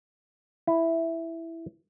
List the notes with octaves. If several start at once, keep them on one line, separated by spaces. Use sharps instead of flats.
E4